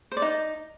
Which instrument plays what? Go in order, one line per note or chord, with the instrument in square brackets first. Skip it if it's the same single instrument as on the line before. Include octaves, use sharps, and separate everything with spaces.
[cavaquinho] C5
D5
D#4